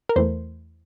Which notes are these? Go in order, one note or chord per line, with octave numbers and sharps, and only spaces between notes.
A#4
E2 E3 A3 C5